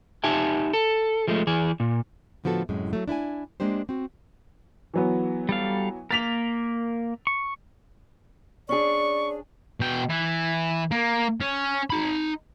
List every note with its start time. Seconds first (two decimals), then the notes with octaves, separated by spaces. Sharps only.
0.24 D#4 G4 E5 G#5 A5
0.73 A4
1.28 F3 G#3 A3
1.47 E3 G#4
1.80 A#2
2.44 A2 D3 F3 B3 F#4 A4
2.69 F#2 A2 C3 G#3
2.93 F#3 A3
3.08 D4 E4 B4 G#5
3.60 G#3 A#3 D4 G4 C5
3.89 C4 F#4
4.94 E3 F#3 B3
5.49 G3 A4 F5
6.11 A#3 A#4 A6 B6 F7
7.27 C#6
8.69 C#4 D4 G#4 D5 C#6
9.80 B2 G5
10.10 E3
10.91 A#3
11.41 C#4
11.90 D#4 B5